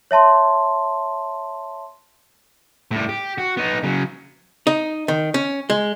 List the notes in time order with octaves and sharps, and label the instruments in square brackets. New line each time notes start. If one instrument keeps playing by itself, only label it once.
[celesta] C#5 E5 A5 C6
[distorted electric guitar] A2 G3
G4
F#4
B3 D#4
C#3 F#3
[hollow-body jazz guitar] D#4
D#3
C#4
G#3